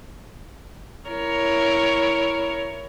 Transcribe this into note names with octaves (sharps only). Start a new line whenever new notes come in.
E4 A#4 C#5